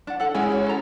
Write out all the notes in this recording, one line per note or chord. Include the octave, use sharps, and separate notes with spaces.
D4 F#5
A4 F#5
G#3 C#4 E4 G#5
F#4 C#5
A4 A#5